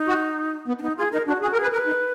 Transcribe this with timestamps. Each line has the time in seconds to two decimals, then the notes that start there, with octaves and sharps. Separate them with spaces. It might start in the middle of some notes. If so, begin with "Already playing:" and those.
Already playing: D#4
0.08 F#4
0.68 B3
0.79 D4
0.82 B3 D#4
0.98 F4 G#4
1.12 D#4 A#4
1.27 D4 F#4
1.42 F#4 G#4
1.53 A#4
1.57 G#4 B4
1.73 A#4 B4
1.86 D#4